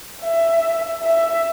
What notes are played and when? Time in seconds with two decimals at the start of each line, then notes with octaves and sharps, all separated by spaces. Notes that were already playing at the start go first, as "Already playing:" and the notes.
0.22 E5
1.03 E5